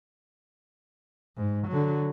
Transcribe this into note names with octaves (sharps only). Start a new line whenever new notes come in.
G#2
D3 F#3